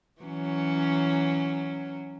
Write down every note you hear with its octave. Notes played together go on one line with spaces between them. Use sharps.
E3 F#3 C#4